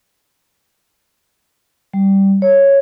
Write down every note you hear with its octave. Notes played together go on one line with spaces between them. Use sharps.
G3
C#5